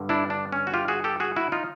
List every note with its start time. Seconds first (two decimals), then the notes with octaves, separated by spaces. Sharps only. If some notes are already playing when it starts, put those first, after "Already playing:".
Already playing: G2 D3
0.09 D4 E4
0.30 D4
0.52 C#4
0.67 F#4
0.74 F4 G4
0.88 F#4 G#4
1.04 G4 A4
1.20 F#4 G#4
1.36 E4 F#4
1.52 D#4 F4